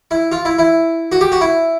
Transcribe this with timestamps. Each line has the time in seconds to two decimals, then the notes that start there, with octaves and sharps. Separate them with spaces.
0.11 E4
0.32 F4
0.45 E4
0.58 E4
1.12 F#4
1.21 G4
1.32 F#4
1.41 E4